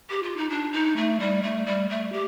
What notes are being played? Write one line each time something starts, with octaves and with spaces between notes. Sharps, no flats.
G4
F4
D#4
D4
D#4
A3
G3
A3
G3
A3
G4